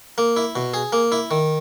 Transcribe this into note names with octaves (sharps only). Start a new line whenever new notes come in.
A#3
E4
B2
G#4
A#3
E4
D#3